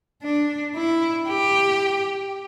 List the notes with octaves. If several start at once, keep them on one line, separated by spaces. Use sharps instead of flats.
D4
E4
G4